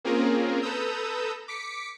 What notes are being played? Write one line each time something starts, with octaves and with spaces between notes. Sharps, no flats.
A#3 C4 C#4 F4 G#4 A#4
A4 B4 A#5 D#6 E6 G6
D6 B6 C#7